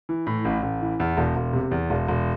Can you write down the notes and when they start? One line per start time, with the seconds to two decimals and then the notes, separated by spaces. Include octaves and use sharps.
0.09 E3
0.27 A2
0.45 A1
0.62 A1
0.82 E3
1.00 E2
1.17 E1
1.36 E1
1.53 C3
1.71 E2
1.90 E1
2.08 E1